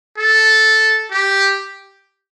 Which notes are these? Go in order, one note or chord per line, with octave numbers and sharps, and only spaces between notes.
A4
G4